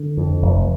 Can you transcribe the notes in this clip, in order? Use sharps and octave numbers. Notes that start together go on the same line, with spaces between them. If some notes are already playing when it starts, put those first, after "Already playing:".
Already playing: D3
F2
F1